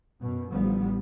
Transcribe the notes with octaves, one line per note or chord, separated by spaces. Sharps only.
F#2 B2
A1 D3 F3 G3 B3